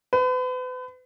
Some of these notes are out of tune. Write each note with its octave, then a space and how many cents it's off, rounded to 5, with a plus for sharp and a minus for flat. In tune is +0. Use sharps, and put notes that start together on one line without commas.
B4 +40